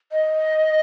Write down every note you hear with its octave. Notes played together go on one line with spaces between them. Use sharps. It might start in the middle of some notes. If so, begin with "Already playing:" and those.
D#5